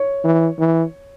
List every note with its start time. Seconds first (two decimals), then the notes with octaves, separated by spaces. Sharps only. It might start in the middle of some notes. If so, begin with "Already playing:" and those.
Already playing: C#5
0.24 E3
0.59 E3